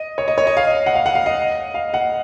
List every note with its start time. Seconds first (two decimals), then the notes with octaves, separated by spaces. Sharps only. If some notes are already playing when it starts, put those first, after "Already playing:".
Already playing: D#5
0.18 C#5
0.28 D#5
0.38 C#5
0.47 D#5
0.57 F5
0.67 D#5
0.86 F#5
0.95 F5
1.06 F#5
1.15 F5
1.26 D#5
1.74 F5
1.94 F#5